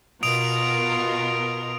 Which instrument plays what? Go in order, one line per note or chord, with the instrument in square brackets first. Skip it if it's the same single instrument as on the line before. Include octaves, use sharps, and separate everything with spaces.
[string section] B2 A#4 [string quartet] F4 [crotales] D#6 D7 F7